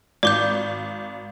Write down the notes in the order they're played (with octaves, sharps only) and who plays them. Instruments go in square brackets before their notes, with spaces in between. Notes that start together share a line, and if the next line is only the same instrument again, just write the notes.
[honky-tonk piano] G#1 [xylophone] D5 D6 G6